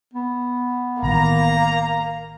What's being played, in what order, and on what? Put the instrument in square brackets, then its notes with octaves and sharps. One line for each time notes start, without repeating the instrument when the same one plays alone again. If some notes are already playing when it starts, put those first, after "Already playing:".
[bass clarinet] B3
[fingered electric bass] A1 D#3 E3 [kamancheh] A#3 [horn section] A#5